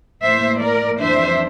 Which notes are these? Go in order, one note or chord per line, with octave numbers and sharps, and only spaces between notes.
A2 E3 A#3 C5 E5
A#4 D5
F2 E3 G3 D4 C5 E5